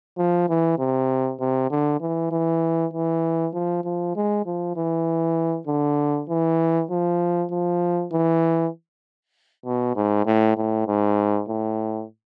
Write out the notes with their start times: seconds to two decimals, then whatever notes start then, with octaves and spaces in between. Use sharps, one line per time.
0.18 F3
0.49 E3
0.79 C3
1.40 C3
1.70 D3
2.01 E3
2.31 E3
2.93 E3
3.54 F3
3.84 F3
4.16 G#3
4.46 F3
4.76 E3
5.67 D3
6.29 E3
6.90 F3
7.51 F3
8.13 E3
9.66 B2
9.96 G#2
10.26 A2
10.57 A2
10.87 G#2
11.48 A2